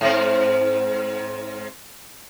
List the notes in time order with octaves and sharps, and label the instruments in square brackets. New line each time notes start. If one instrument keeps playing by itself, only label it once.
[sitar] G#2 C4